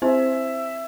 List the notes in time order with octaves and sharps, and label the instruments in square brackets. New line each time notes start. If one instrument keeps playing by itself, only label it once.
[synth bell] C4 E4 C5 [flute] E5